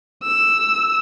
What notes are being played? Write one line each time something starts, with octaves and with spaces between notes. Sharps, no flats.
E6